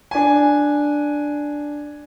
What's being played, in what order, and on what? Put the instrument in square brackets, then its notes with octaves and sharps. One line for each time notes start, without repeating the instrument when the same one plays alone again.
[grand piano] D4 G#5